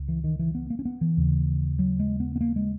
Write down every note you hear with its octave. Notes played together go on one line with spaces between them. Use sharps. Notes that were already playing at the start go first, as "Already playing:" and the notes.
Already playing: C#2
E3
D#3
E3
B3
A#3
C#4
B3
E3
D#2 C#3
F#3
G#3
B3
B3
A#3
G#3